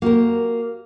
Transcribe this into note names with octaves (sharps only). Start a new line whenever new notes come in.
A#3 F#4 G4 A#4